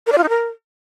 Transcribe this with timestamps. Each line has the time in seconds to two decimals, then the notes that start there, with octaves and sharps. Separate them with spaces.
0.07 A#4
0.12 D5
0.18 F4
0.23 D#4
0.29 A#4